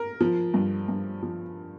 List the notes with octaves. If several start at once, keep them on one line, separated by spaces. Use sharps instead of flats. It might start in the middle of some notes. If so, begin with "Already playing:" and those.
Already playing: A#4
F3
G2
G2
F3